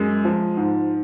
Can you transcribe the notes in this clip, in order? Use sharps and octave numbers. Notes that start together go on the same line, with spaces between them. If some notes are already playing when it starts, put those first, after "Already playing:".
Already playing: F#2 G#3
F3
G#2